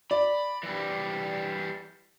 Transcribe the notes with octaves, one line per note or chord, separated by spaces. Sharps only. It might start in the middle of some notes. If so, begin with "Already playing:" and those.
D5 B5
E3 G3